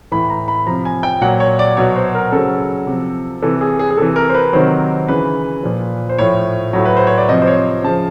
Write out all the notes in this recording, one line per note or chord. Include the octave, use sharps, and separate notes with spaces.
A2 E3 B5
A#5
B5
C3 F3 A#5
G#5
G5
A#2 F#3 F#5
C#5
D5
B2 F#3 C#5
C5
A#4
C#3 F#3 A4
C3 F3
C3 E3 A4
G#4
G#4
G#4
C3 E3 A4
A#4
C5
B4
C3 D#3 F#3 C5
C#3 E3 B4
A#2 F3
C5
A2 F3 C#5
A2 F#3
B4
C5
C#5
D5
C3 F3 D#5
C5
C#5
C#3 F3 A5